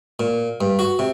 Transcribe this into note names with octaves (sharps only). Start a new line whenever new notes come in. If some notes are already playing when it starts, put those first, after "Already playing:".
A#2
G2
F#4
C3